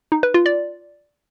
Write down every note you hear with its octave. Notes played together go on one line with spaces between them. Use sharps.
D#4
B4
F4
D5